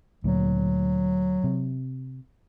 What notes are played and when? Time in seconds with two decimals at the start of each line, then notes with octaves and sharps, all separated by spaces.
0.24 D2 A#2 F#3
1.44 C3